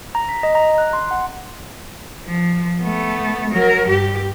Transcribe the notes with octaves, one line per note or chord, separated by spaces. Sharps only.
A#5
B6
D#5
A#5
F#6
C6
F#5
F3
A3 B3
F#3 A#4
G2 G4